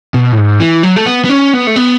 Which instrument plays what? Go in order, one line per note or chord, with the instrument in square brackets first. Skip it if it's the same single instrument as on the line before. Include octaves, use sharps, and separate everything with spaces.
[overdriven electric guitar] B2
A2
G#2
E3
F#3
A3
B3
B3
C#4
B3
A3
B3